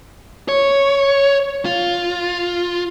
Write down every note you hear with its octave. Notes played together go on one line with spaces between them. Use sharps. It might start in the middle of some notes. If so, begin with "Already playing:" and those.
C#5
F4